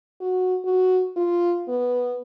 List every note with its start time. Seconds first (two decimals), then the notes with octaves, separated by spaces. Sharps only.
0.21 F#4
0.65 F#4
1.16 F4
1.68 B3